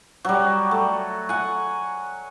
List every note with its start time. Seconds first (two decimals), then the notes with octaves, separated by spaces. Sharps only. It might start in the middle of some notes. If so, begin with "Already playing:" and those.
0.25 F#3 G3
0.71 A3
1.29 F#5 G#5